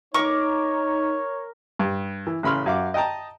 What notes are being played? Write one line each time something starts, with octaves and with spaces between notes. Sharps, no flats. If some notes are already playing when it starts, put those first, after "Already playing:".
D#4 A#4 C#5 C#6 D6
G2
E3
A1 C#3 B5 C6 F6
F#2 F5 D6
D#5 G5 A5 A#5